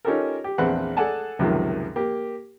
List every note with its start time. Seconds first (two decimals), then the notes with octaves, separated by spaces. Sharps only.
0.05 C#4 D#4 F4 G4 A4 A#4
0.44 G4
0.58 A#1 E2 C4 B4 F#5
0.97 G#4 A4 D5 F#5 G#5 A5
1.39 C#2 F#2 C3 D#3 F3
1.96 A#3 G4